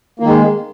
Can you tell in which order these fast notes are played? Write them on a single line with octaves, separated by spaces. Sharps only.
A#3 D#3 G#3